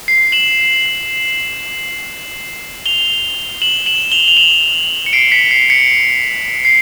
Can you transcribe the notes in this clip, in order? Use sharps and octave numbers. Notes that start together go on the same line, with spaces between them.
C7
E7 F#7
F7 G7
E7 F#7
E7 F#7
F7 G7
F7
E7 F#7
C#7
C7 D7
B6 C#7
C7
B6 C#7
C7